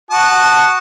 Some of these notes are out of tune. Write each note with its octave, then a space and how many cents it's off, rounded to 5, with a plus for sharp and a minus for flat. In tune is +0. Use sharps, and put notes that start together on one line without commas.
F#4 +0 A5 +0 D#6 -20